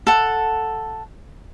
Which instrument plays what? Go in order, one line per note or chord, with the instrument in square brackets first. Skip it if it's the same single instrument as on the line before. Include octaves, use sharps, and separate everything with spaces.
[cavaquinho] A4 F#5